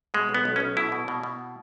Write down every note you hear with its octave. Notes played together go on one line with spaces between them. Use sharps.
B2 G#3
B1
B3
B1
B1 C#4
B2 E4
B2
B2
B2